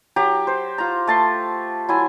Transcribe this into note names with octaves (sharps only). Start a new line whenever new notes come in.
F#3 G4 A#5
C5
F4 A#5
A3 A5 C6
F#3 E4 G#5